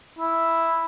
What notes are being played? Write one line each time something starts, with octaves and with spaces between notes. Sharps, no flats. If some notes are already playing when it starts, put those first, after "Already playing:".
E4